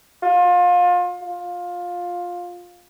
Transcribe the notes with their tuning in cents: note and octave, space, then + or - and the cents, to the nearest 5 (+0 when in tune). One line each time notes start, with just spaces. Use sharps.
F4 +30
F4 +15